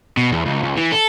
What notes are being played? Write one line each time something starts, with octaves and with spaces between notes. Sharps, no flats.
B2
E2
C#2
C#2
E3
A4